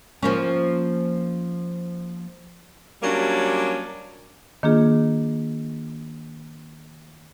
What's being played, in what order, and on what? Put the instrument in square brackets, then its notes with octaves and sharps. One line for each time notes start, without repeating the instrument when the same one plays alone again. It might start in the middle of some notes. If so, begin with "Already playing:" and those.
[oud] F3 A#3 C#4
[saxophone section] F#3 G3 A#3 C#4 D4
[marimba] D#3 A#3 D4 F4 G#4